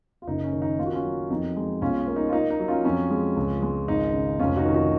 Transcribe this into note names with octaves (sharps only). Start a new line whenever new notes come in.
F4
F#1 D#4
C#4
D#3
D#4
A#3 F4
F#4
C#4 F4
F#3
F2 D#4
G#3
B1 C#4 F4
A#3
D#4
F4
A#3 D#4
D#4
F#3
C#4 F4
F2 C#4 F4
G#3
C#2
G#3
G#1 D#4
C#3
F1 C#4 F4
D#4 F#4
D#3
D#4 F#4